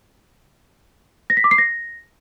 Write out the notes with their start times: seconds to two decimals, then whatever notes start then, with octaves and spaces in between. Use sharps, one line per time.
1.30 A#6
1.37 B6
1.44 D6
1.51 C7
1.58 A#6